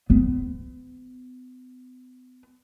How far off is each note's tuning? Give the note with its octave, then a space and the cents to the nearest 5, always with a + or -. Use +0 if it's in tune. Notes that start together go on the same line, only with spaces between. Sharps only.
B3 +40